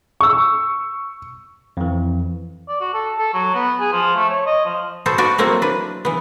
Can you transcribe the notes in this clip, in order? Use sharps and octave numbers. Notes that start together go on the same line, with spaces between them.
C#6 E6
F2 E3
D5
F#4
A4
A4
F#3
B3
G#4
F3
A3
C#5
D#5
F3
B3 F#4 A4 C5
F#4 A4 B4 D5 E5
F#3 A3 A#3 C4 E4 F#4
D4 B4
E3 B3